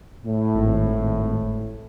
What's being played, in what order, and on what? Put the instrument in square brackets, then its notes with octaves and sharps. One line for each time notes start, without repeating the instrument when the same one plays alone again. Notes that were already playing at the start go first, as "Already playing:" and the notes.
[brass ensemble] A2
[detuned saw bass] G#1